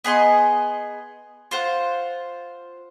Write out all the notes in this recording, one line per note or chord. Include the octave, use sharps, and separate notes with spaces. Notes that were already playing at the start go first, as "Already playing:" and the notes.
B3 G#4 D#5 C6
F4 C5 F#5